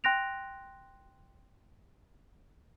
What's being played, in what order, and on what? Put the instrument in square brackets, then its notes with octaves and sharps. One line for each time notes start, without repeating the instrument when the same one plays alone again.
[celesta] G5 C6 F#6 A#6 D7 F7